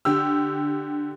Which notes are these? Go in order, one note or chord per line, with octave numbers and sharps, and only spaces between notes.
D3 G4 E6